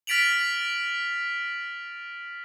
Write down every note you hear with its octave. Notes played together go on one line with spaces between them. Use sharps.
F6 A6 B6 D7 F7 F#7